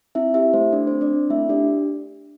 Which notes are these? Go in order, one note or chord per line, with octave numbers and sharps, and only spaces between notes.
C4 E4 E5
E4 G4 E5
A3 C5
A3 D4 D5
C4 C5
D4 D5
C4
A3 E4 E5
D4 G4 D5